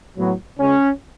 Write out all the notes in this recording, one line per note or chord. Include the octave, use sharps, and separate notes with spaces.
A2 F#3 B3
C#2 C#3 G#3 C#4